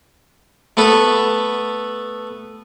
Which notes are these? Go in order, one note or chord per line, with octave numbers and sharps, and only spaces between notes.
A3 B3 A4 B4